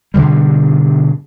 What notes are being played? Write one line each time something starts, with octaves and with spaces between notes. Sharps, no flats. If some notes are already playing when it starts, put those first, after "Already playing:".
G2 B2 D3 G3